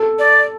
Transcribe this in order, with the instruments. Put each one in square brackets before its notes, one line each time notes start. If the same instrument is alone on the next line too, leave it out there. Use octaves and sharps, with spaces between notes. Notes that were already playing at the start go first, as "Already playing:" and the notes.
Already playing: [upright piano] A4
[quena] D5